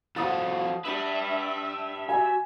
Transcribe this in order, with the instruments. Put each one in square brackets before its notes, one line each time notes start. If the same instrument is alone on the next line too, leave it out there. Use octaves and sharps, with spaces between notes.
[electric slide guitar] F3 F#4 A4 [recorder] F5 [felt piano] F#5 D#6 A6
[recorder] D4 [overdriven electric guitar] G4 B4 [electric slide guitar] E5
[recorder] F#4 [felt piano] G#5